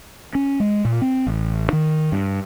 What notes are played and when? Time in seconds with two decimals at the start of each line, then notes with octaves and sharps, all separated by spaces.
0.35 C#4
0.60 G#3
0.85 A#2
1.02 C4
1.27 A1
1.73 D#3
2.12 G2